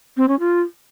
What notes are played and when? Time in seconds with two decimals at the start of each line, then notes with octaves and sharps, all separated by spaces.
0.17 C4
0.28 C#4
0.39 F4